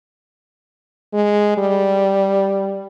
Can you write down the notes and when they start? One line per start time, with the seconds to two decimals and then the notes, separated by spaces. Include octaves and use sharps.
1.13 G#3
1.58 G3